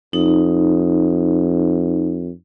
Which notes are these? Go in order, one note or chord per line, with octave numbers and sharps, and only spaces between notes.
F2 D#4